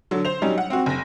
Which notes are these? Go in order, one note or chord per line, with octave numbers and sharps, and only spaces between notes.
D3 F#3
C5 F7
F#3 G3 C#4 D#4
F#5
C4 F#4
F#1 A#6